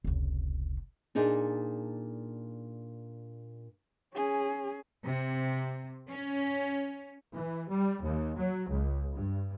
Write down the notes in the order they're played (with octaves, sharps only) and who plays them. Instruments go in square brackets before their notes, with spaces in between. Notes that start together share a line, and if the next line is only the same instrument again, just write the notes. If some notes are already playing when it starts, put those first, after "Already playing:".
[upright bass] F1 C#2
[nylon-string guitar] A#2 D4 D#4 G#4 A4
[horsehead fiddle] C#4 G#4
[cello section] C3
C#4
[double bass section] E3
G3
D#2
F#3
C#2
G2